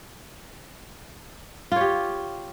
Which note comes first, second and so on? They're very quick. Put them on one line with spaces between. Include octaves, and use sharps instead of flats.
F4 C#5 G4